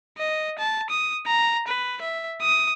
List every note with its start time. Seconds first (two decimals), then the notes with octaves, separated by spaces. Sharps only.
0.18 D#5
0.58 A5
0.90 D#6
1.27 A#5
1.68 B4
2.01 E5
2.41 D#6